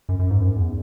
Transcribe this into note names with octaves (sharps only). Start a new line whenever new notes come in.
F#2
F#2
G#2
F#2
E2